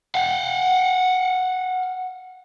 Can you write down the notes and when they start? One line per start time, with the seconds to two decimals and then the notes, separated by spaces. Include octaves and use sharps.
0.15 F5 F#5